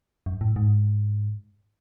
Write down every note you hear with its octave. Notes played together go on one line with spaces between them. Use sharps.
F#2
A2
G#2